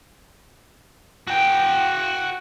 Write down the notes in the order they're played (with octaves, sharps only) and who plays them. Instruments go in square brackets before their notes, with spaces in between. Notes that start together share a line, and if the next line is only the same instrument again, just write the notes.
[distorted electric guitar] F#4 G5